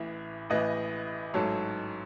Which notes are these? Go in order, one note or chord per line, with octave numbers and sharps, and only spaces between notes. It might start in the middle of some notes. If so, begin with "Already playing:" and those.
Already playing: A1 A2 E3 E5
A1 A2 E3 B4 D#5
A1 G#2 F#3 A4 C#5